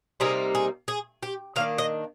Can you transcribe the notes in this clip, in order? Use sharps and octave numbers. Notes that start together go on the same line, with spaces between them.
C3 G3 A#3 D#4 G#4
G#4
G#4
G4
D#3 A#3 D4 F5
D#5